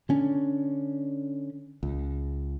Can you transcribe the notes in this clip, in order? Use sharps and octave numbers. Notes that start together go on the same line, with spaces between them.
D3 C#4 D4
C#2